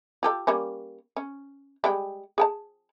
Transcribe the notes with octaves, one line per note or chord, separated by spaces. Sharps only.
F4 G4 A4
G3 A#3 C#4
C#4
G3 G#3 G5
G#4 G5 A5